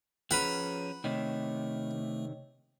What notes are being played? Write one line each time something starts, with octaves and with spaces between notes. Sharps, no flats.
F3 C#4 G#4 B4 F#5 A#5 B5
C3 D#3 A3 C#5 D#5 G5